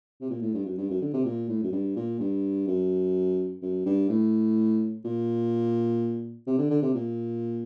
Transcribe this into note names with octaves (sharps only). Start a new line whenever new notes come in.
C3
A#2
A2
G2
F#2
G2
F#2
D3
C3
A#2
A2
F#2
G2
A#2
G2
F#2
F#2
G2
A2
A#2
C3
D3
D3
C3
A#2